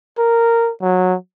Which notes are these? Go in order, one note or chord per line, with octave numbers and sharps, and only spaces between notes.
A#4
F#3